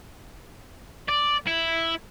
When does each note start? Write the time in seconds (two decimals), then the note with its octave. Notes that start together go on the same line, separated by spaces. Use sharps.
1.09 D5
1.47 E4